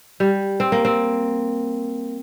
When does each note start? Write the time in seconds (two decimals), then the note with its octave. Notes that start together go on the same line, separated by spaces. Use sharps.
0.20 G3
0.60 C4
0.72 A#3
0.85 C4